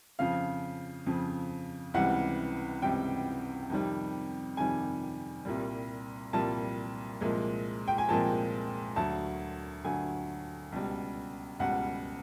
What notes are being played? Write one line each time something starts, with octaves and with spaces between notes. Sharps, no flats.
F2 C#3 F3 F5
F2 C#3 F3
C#2 C3 E3 G3 F#5
C#2 C3 E3 G3 G5
F2 C3 D#3 G3
F2 C3 D#3 G3 G#5
C2 A#2 G3
C2 A#2 G3 A5
C2 A#2 F3 G#3
G5
G#5
C2 A#2 F3 G#3 A5
D2 D3 F#3 A5
D2 D3 F#3 G#5
C#2 B2 G3
C#2 B2 G3 F#5